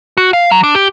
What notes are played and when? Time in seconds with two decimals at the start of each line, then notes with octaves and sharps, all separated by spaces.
0.17 F#4
0.33 F5
0.51 F#3
0.64 D4
0.75 G4